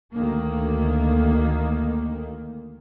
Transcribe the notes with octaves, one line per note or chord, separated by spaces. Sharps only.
D2 D#3 A#3